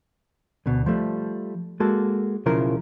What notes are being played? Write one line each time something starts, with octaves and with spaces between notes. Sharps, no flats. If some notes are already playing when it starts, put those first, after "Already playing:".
D2 B2
F3 G3 A3
G#3 A#3 F#4 A4
B1 C#3 F3 E4 A#4